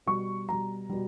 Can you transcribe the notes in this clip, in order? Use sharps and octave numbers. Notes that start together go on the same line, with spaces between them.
B2 G3 C#6
B2 G3 A#5
B2 G3